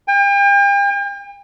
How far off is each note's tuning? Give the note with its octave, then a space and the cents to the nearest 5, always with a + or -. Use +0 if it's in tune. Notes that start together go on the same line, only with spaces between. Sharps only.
G5 +40